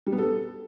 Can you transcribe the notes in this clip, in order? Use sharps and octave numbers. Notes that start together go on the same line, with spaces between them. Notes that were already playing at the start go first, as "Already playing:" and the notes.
G3
B3
A4